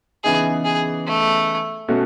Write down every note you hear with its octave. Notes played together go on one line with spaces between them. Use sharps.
C#3 E3 B3 D#4 G#4
G#4
A3
B2 A3 C#4 F#4